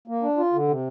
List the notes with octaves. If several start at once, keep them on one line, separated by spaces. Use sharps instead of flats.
A#3
D4
F4
D3
C3